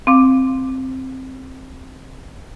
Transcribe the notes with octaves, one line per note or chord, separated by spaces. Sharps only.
C4 F5 D6